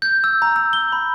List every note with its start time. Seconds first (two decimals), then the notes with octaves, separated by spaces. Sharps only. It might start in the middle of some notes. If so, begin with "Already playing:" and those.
0.02 G6
0.24 E6
0.42 A#5
0.56 E6
0.73 G7
0.92 B5